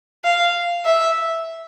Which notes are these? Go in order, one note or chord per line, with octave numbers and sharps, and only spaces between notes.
F5
E5